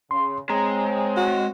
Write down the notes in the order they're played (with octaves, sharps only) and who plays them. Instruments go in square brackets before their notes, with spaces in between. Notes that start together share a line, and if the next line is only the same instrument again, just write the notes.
[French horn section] C#3 [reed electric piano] C6
[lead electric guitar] G#3 [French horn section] C4 C#5 [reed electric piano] A#5
[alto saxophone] F#4